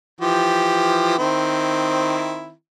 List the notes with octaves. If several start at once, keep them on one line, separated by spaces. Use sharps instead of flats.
E3 F3 G4
D#3 C4 E4